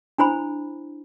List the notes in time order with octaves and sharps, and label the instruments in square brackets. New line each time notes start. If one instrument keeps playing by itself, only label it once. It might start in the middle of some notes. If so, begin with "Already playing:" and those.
[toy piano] D4 E4 C5 B5